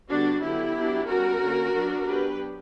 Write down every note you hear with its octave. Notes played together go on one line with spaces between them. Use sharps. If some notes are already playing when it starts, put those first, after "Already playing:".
D3 G3 B3 D4 F#4
D3 F#3 B3 E4 G4
F#3 B3 D4
G3 C#4 F#4 A#4
D3 A#3 C#4
F#3 B3 D4
F#3 B3 D4 G4 B4